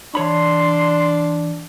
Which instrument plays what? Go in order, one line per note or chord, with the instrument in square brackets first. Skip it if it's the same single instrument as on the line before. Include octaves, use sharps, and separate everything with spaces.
[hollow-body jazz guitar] E3 C#5 B5 [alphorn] D4 [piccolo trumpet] C6